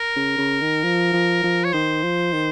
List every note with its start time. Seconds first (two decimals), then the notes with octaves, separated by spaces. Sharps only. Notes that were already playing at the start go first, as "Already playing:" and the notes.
Already playing: A#4
0.16 C#3
0.38 C#3
0.61 D#3
0.84 F3
1.13 F3
1.43 F3
1.64 C#5
1.73 D#3 C5
2.03 F3
2.33 D#3